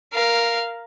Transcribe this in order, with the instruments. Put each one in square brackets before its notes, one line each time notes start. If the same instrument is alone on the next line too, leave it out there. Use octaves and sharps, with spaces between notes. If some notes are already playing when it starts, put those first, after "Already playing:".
[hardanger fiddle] A#4 F5